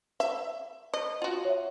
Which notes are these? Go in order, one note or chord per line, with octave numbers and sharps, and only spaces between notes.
E5
D#5
F4 F#4
C#5 E5